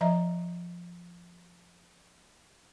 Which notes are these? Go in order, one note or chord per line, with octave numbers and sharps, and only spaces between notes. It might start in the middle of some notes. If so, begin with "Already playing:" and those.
F3 D#5 E5 A#5